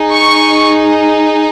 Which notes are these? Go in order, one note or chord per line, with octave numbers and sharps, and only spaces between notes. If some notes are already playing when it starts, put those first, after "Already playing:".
Already playing: D#4 G#4
C#6